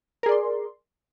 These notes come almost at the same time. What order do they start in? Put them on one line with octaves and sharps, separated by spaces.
A#4 G#4 D5 C6